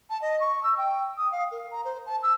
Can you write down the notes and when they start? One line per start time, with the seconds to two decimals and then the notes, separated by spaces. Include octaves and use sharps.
0.10 A5
0.22 D#5
0.40 C#6
0.63 E6
0.78 G5
1.17 D#6
1.32 F5
1.51 A#4
1.71 A#5
1.85 C5
2.06 A5
2.23 E6